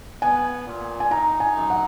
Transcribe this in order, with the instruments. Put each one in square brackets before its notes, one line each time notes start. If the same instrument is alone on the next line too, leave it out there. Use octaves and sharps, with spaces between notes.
[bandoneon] B3 [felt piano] G#5
[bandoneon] A#2
[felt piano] G#5
[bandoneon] D#4 [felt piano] A#5
[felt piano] G#5
[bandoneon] F#2
[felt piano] F#5